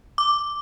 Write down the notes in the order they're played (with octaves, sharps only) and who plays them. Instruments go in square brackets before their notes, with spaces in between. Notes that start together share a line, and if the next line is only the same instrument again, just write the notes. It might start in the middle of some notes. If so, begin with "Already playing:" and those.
[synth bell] D6